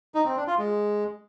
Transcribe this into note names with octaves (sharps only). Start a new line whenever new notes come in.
D#4
C4
D4
F4
G#3